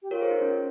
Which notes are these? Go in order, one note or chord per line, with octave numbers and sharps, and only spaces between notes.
G4
F4 A#4 C#5
G#4 C5
D#4
C#4